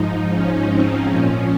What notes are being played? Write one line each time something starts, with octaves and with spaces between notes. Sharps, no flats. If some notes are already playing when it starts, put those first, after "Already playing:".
Already playing: G#2 F3 D#4
C#4
C4
A#2 F3 C#4